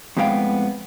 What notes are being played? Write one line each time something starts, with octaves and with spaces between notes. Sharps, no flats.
F2 A2 G#3 B3 F5 G5